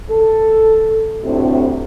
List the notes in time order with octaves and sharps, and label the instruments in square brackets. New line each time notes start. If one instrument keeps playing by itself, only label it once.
[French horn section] A4
D2 A2 C3